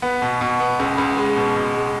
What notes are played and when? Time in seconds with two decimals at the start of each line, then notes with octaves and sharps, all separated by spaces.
0.02 B3
0.22 B2
0.41 B2
0.60 B3
0.79 C#2
0.98 C#2
1.17 G#3
1.36 B2
1.56 B2
1.75 G#3